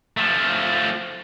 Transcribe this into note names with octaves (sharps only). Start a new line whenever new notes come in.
F3 A3